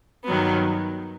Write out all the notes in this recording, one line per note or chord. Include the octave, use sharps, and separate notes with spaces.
G2 D#3 F#3 B3